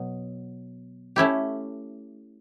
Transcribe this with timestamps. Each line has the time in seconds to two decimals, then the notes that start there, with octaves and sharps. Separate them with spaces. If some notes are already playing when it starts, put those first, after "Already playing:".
Already playing: B2 F#3
1.16 A3 C#4 E4 G4